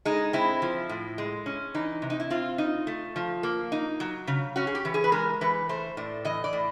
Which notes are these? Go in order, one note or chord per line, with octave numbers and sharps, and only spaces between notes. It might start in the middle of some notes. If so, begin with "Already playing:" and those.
G#3 D#4
C4 E4
F3
A2
G#3
C#4
E3 D#4
C3
D#4
E4
C4 F4
D#4
A3
F3
A#3
D#4
F#3
C#3
C#4 F#4
G#4
G4
E3
G#4
B4
G#3 A#4
E3 B4
A3 C5
A2 D5
E3 D#5
D5
A2